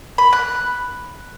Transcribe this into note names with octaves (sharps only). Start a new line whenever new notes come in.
B5
F#6